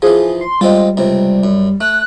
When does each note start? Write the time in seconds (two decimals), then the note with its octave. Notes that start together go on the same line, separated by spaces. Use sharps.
0.02 E3 F3 G#4
0.41 C6
0.61 G3 G#3 C4 F4
0.97 C#2 C3
1.44 F#2
1.81 A3 F#6